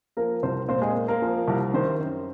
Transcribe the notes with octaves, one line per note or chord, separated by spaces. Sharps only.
F3 A#3 A#4
C2 C4 C5
A#2 C4 C5
G#3 G#4
A#3
A#3 A#4
F3
C2
D#3 C4 C5
F#2